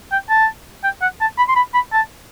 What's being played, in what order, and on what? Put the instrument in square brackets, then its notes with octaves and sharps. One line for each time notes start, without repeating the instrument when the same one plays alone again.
[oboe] G5
A5
G5
F#5
A5
B5
C6
B5
B5
A5